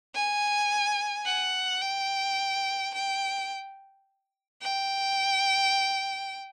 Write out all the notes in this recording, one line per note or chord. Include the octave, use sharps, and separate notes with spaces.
G#5
F#5
G5
G5
G5